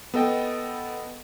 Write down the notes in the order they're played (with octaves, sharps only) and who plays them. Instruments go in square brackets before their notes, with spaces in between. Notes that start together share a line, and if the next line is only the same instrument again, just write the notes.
[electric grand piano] B3 A4 D#5 G5